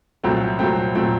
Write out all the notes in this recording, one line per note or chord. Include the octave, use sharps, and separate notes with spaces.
C2 A#2 F#3 A3 C4
C2 A#2 F#3 A3 C4
A#2 F#3 A3 C4